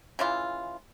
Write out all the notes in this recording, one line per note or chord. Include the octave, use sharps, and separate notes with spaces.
C#3 E3 F4